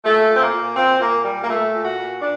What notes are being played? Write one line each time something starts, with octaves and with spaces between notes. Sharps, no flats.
A#2 A3
A#2
C4
A#3
A#2
A#2 C4
A#2 A#3
A#2 G3
A#3
A#2 A3
A#2
F#4
A#2
A#2 D4